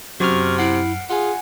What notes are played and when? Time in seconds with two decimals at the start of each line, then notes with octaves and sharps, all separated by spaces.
0.20 F#2 C3 F#4 C#6 F6
0.58 E4 F#5 C7 D7
1.10 F4 G#4 F#5 G#5